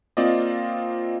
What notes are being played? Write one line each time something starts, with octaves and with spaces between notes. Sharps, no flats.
A#3 C4 F4 D5 D#5